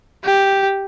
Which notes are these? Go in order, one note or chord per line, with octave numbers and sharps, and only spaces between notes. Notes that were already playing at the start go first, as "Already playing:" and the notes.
G4